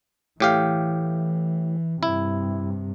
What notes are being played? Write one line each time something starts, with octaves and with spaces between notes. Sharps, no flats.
A2 E3 G4 F5
G2 C3 E4